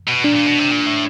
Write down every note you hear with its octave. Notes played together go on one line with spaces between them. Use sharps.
B2
A#2 D4
A#2
B2
C3
A#2
A2